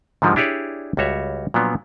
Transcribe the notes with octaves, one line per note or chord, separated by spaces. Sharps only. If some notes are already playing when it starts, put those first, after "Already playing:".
G#2 D3 D#3 F3 G3 G#3
D4 E4 G4 G#4 C#5 D5
C#2 G3 F#4 C#5 E5
A#2 F3 F#3 B3 D4